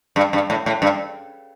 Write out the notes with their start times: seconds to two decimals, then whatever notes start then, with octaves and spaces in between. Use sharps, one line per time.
0.16 G2
0.33 G2
0.50 A2
0.66 A2
0.82 G2